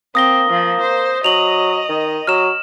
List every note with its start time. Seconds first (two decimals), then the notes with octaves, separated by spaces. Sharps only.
0.15 A#3 C4 D#6 A#6 G7
0.50 F3
0.81 C5
1.24 F#3 D#5 F7 F#7
1.89 D#3
2.27 F#3 F6 E7